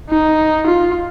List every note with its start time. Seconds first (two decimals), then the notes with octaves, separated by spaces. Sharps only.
0.09 D#4
0.66 F4